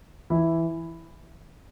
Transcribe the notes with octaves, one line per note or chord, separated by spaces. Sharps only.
E3 E4